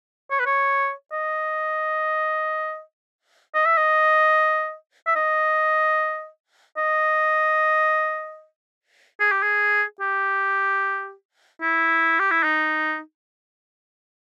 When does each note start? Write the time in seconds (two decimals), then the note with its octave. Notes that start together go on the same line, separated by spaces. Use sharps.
0.31 C#5
0.40 B4
0.46 C#5
1.12 D#5
3.55 D#5
3.66 E5
3.78 D#5
5.07 E5
5.16 D#5
6.77 D#5
9.20 G#4
9.32 G4
9.43 G#4
10.01 G4
11.62 E4
12.19 G4
12.31 E4
12.43 D#4